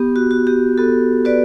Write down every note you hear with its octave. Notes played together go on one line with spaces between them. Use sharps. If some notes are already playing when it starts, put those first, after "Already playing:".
Already playing: B3 G4
F#4
F#4
G4
B3 F#4 A4
F#4 B4 D5